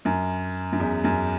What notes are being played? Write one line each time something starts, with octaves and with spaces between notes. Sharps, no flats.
F#2
F#2
E2
F#2